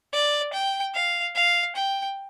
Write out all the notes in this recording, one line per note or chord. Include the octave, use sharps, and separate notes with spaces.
D5
G5
F5
F5
G5